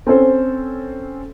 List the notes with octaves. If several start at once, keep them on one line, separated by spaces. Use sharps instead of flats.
C4 C#4 A4 C5